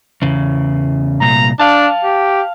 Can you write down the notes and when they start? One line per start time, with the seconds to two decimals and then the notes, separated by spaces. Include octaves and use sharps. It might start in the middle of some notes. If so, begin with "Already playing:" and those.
0.22 E2 C#3
1.21 C2 A#2 A#5
1.59 D4 F5 A5
2.04 G4